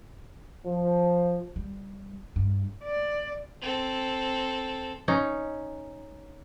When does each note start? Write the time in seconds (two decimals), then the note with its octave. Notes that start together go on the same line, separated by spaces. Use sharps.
0.65 F3
1.56 G3
2.36 G2
2.84 D5
3.61 C4 A4
5.08 C#4 D#4